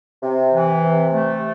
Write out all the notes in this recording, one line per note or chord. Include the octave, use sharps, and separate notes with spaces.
C3
E3
C3
A3